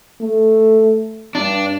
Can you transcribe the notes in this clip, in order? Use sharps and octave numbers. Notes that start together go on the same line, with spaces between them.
A3
G2 D4